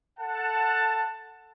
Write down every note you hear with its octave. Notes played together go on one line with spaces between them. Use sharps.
A4 F#5 A5